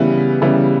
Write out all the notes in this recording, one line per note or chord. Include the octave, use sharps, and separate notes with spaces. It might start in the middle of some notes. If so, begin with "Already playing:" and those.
Already playing: C#3 E3 G3 B3 E4
C#3 E3 G3 B3 E4